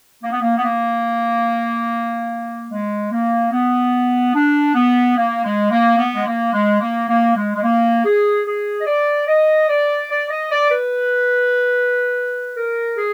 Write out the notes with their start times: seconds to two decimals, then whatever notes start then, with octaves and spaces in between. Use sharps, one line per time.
0.23 A#3
0.32 B3
0.42 A#3
0.58 B3
0.64 A#3
2.70 G#3
3.12 A#3
3.52 B3
4.34 D4
4.75 B3
5.16 A#3
5.44 G#3
5.71 A#3
5.98 B3
6.14 G#3
6.27 A#3
6.53 G#3
6.80 A#3
7.09 A#3
7.36 G#3
7.55 G#3
7.63 A#3
8.05 G#4
8.46 G#4
8.81 D#5
8.87 D5
9.28 D#5
9.69 D5
10.10 D5
10.30 D#5
10.51 D5
10.71 B4
12.56 A#4
12.97 G#4